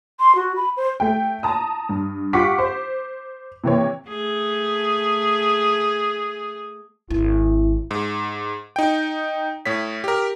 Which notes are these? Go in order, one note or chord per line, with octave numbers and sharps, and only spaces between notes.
C6
F#4
B5
C5
A3 G5
A5 A#5 D#6
G2
F4 G4 F#5 C#6 D6 B6
C5
C3 E3 A#3 C#5
A3 G#4
G#1 C4 E4
G#2
D#4 G5
A2 C#5 B6
G4 A#4